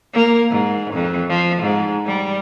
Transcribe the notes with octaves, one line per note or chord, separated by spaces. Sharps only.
A#3
G#2
F2
F3
G#2
G3